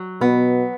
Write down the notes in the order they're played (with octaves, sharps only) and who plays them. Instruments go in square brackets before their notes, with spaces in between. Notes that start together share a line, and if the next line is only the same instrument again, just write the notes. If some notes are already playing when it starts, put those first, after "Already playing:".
Already playing: [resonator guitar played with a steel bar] F#3
[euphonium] B2 [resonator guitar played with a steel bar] B3